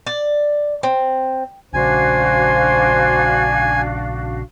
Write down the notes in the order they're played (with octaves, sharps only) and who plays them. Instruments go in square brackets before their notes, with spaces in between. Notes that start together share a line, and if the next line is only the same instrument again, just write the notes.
[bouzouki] D5
C4
[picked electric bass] A#1 C#3 [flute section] D4 F#4 F5 [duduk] C5 [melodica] G#5